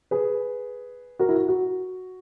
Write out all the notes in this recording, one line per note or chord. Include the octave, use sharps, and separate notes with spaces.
G#4 B4
F#4 A#4
E4
F#4
F#4